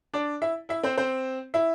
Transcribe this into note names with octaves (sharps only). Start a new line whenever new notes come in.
D4 D5
E4 E5
E4 E5
C4 C5
C4 C5
E4 E5